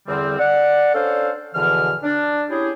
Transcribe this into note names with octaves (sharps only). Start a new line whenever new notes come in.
E2 D3 G3 C4
D5 F#5
C#4 D4 A4 C5 F5
E2 B2 D3 E3 F3 F6
D4
C#4 E4 G4 G#4